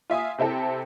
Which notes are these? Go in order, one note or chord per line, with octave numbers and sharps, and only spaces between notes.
F4 E5 G#5 D#6
C3 C4 E4 A4